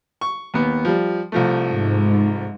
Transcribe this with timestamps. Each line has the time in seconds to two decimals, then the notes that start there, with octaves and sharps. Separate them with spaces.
0.21 C#6
0.54 D#2 B3
0.85 F3 G3
1.32 C2 F3 A3
1.68 G#2